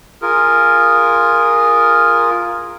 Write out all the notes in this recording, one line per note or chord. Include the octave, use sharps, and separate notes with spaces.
F4 G#4 A#4